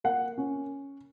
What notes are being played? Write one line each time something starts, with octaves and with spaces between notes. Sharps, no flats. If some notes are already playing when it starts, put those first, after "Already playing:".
A#3 F#5
C#4